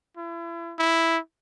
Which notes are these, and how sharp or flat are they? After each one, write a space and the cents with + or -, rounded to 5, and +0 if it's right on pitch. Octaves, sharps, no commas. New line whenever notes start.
E4 +35
E4 +0